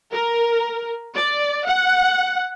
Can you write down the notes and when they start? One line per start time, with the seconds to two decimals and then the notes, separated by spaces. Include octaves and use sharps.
0.12 A#4
1.16 D5
1.65 F#5